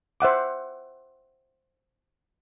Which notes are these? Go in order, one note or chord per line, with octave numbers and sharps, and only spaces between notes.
C5 E5 F#5 D6